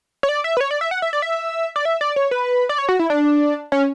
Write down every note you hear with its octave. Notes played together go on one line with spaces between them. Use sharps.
C#5
D5
E5
B4
C#5
D5
E5
F#5
E5
D5
E5
D5
E5
D5
C#5
B4
D5
C#5
F#4
E4
D4
C#4